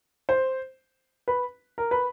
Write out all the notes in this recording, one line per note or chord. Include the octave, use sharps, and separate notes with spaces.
C5
B4
A#4
B4